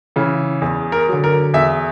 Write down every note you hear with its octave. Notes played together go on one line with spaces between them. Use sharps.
C#3 E3
E2
A#4
D3 F#3
A#4
E2 E5